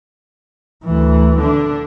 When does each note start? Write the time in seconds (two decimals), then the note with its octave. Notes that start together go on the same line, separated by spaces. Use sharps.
0.85 D2 E3
1.38 D3 D4